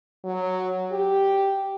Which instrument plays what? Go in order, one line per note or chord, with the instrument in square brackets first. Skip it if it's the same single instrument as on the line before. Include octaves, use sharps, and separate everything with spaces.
[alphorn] F#3
G4